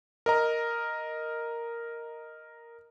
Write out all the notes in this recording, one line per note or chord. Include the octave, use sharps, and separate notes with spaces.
A#4 D#5 A#5